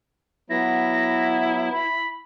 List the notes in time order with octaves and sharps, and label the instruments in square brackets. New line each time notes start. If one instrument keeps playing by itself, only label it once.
[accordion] F#3 B3 [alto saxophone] E4 [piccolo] A#6
[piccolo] B5